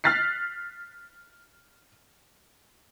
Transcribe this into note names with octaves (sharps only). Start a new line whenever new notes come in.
F6 F#6 A6 B6 C7